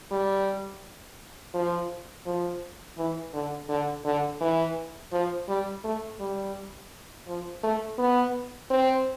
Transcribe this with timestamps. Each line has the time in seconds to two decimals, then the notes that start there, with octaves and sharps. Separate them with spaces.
0.11 G3
1.54 F3
2.26 F3
2.98 E3
3.34 D3
3.69 D3
4.05 D3
4.41 E3
5.13 F3
5.48 G3
5.84 A3
6.20 G3
7.28 F3
7.63 A3
7.98 B3
8.70 C4